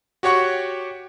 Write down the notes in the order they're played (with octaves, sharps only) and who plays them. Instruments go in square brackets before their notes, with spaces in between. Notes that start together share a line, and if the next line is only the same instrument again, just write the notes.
[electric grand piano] F#4 G4 C#5 F#5 C#6